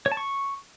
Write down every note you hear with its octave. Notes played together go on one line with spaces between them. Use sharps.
C#5
A5
C#6